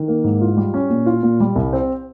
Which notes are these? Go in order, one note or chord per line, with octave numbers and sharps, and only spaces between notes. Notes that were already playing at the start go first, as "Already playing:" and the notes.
Already playing: D#3
A#3
G#2
F4
G3
C#4
A#2
F4
A#2
G3
C2
C4